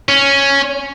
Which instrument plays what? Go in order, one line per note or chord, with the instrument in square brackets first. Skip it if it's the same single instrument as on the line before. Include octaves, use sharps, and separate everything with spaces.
[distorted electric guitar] C#4